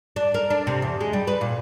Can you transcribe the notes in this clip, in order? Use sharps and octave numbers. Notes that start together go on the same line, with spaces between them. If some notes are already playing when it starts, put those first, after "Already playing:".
D4
A#4
D4
C3
E2
G#3
G3
B4
A#2